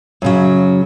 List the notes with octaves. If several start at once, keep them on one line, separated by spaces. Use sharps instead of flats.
F#2 C#3 F#3